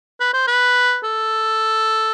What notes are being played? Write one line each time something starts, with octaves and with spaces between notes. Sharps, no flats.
B4
C5
B4
A4